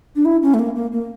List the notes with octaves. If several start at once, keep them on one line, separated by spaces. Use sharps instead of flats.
D4
E4
C#4
A3
A#3
A#3
A#3